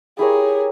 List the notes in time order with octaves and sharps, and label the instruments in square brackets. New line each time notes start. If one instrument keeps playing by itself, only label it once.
[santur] E4 G4 A#4 C#5 [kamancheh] G#4